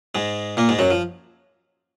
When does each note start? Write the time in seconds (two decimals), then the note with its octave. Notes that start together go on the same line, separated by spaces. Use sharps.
0.15 G#2 G#3
0.57 A#2 A#3
0.69 G#2 G#3
0.79 F#2 F#3
0.91 F3